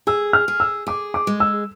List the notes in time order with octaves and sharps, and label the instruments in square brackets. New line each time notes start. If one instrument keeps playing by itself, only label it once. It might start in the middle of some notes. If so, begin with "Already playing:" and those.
[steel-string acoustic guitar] G#4 [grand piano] E6
[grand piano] F6
[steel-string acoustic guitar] G#4
[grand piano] E6
[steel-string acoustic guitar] G#4 [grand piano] D6
[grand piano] D6
[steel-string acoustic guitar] G#3
[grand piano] E6